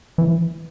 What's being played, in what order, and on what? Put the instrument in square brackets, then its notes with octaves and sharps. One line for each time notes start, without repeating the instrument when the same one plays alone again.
[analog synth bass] E3